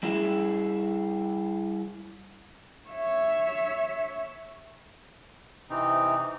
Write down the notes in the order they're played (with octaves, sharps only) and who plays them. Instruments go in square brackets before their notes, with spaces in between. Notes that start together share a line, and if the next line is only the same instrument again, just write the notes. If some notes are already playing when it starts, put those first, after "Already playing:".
[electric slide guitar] G3 E4 G#4
[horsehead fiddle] C#5 E5
[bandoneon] C3 E3 C4 D#4